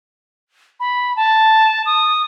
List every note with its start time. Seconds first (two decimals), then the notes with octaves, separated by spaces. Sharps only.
0.80 B5
1.16 A5
1.86 D#6